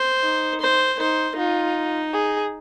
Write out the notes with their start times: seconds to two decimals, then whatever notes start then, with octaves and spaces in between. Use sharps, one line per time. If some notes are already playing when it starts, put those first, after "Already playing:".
Already playing: C5
0.22 D#4
0.61 C5
0.99 D#4 C5
1.36 D#4 F4
2.13 G#4